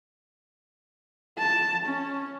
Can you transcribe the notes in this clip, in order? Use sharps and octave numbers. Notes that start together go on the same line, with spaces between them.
A5
C#4